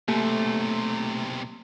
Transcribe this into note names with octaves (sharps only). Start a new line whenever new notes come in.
B1 C3 A3 A#3